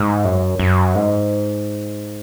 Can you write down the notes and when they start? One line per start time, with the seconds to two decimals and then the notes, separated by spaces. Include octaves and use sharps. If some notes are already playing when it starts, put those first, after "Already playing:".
Already playing: G#2
0.25 F#2
0.59 F#2
0.95 G#2